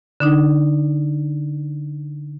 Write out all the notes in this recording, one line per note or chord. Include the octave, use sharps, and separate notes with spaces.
D3 D4 D#4